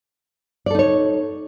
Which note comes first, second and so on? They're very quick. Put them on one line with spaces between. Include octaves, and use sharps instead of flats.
D5 A4 D#4 C#5